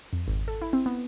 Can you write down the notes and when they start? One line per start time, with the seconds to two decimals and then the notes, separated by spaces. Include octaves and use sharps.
0.13 F2
0.28 G#1
0.48 A4
0.62 E4
0.73 C4
0.86 B3